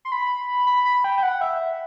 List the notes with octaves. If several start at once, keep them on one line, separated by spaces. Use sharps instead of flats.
C6
B5
B5
B5
G5
G5
F#5
E5